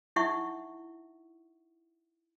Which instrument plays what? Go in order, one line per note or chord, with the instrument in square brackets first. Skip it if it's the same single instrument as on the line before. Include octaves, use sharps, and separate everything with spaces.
[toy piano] D#4 E4 E5 F#5 C#6